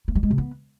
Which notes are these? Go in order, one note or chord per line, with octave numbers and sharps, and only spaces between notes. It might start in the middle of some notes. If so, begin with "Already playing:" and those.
A#3
G3
G#3
C3
B3